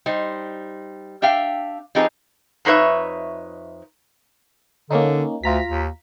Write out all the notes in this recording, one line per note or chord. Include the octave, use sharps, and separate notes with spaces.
G3 D#4 C5
D4 E5 F5 G5
F3 C4 D#4 G4 G#4 B4
F2 D#4 B4 C#5 E5
D3 A#3 C#4 D#4
D2 F4 A#5 B6
D#2